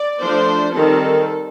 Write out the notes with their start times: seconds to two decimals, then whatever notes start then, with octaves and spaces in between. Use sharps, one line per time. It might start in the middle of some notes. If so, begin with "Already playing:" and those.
Already playing: D5
0.21 F3 A3 D4 C5
0.74 D#3 G3 C4 A4